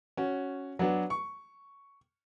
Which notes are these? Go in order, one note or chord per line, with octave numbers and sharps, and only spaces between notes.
C#4 F#4
F#3 B3 D4 F#4
C#6